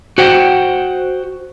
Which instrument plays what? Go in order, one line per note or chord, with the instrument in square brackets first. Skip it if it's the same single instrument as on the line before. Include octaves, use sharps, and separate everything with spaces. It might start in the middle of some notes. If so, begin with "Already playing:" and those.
[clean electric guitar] F#4 C5 F#5 G5